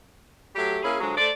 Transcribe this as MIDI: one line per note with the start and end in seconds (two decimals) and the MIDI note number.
0.55 0.78 54
0.55 0.78 57
0.55 0.78 67
0.83 0.96 58
0.83 0.96 61
0.83 0.96 64
0.83 0.96 68
1.00 1.16 50
1.00 1.16 53
1.00 1.16 54
1.00 1.16 56
1.16 1.29 57
1.16 1.29 72
1.16 1.29 74